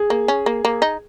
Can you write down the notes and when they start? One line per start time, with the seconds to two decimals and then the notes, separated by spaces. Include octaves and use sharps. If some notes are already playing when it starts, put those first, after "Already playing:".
Already playing: G#4
0.10 A#3
0.28 C#4
0.46 A#3
0.65 A#3
0.82 D#4